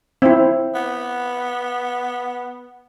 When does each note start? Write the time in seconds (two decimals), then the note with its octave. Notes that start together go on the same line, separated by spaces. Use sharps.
0.22 C4 E4
0.75 B3